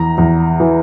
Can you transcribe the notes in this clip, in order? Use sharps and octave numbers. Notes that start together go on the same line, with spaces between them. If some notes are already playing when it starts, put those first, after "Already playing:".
Already playing: E2 A#5
E2
E3